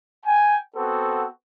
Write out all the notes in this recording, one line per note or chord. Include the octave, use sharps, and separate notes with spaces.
G5 G#5
B3 C4 F#4 A4